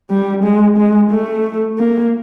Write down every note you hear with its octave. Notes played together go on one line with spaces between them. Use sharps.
G3
G#3
G#3
A3
A#3